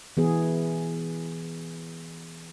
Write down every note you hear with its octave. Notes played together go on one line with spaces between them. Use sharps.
E3 B3 G#4